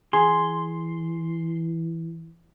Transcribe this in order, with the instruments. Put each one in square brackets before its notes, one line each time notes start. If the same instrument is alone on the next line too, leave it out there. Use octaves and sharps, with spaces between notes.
[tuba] E3 [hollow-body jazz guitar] G#4 [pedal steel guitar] C6